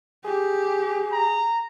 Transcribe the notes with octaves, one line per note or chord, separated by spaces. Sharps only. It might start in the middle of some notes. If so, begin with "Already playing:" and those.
G4 G#4
A#5